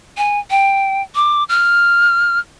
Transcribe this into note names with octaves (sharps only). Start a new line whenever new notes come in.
G#5
G5
D6
F6